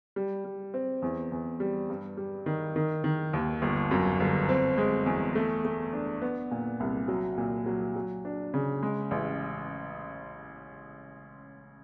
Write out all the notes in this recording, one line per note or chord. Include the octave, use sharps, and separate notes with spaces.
G3
G3
C4
E2
E2
G3
G2
G3
D#3
D#3
D#3
D#2
G1
F#2
G1
C4
G#3
E2
A3
A3
D4
B3
A#2
C2
F#3
A#2
F#3
F#3
D4
C#3
G#3
A1